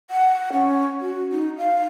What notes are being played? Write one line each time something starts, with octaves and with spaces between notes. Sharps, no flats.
F#5
C#4
F#4
D#4
F5